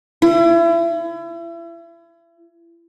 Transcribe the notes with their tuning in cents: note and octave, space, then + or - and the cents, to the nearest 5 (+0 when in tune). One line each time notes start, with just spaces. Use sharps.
E4 +35